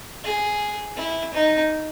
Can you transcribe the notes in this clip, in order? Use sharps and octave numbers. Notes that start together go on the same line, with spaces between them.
G#4
E4
D#4